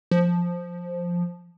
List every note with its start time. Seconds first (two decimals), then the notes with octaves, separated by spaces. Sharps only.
0.11 F3